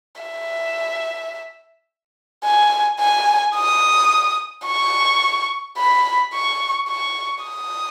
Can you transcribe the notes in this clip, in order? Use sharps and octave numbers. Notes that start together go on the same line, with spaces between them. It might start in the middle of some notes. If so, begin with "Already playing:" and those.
E5
G#5
G#5
D#6
C#6
B5
C#6
C#6
D#6